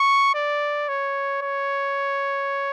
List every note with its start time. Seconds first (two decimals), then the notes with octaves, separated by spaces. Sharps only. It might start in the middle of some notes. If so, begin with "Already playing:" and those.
Already playing: C#6
0.34 D5
0.88 C#5
1.42 C#5